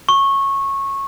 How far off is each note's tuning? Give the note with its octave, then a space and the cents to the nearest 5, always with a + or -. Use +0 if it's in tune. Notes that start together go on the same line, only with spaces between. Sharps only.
C#6 -15